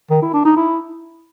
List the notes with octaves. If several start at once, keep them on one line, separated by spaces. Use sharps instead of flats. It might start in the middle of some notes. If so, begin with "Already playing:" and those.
D#3
E4
D4
D#4
E4